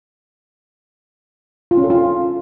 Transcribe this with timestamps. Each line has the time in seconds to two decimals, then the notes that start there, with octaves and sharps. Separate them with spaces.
1.71 F4
1.77 C#4
1.84 A4
1.90 F4